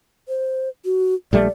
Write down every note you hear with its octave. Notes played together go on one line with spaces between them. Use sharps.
C5
F#4
A#1 G3 A3 D5